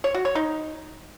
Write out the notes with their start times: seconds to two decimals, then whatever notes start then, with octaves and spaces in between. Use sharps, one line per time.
0.04 C#5
0.14 F#4
0.25 C#5
0.35 D#4